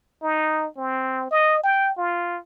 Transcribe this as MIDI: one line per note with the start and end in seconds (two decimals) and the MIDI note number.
0.22 0.67 63
0.77 1.30 60
1.31 1.62 75
1.63 1.92 79
1.98 2.38 65